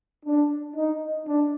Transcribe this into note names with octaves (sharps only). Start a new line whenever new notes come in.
D4
D#4
D4